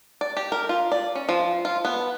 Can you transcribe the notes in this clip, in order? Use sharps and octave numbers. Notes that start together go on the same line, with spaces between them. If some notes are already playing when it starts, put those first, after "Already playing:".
D5
G4
A#4
F4
D5
C#4
F3
F4
B3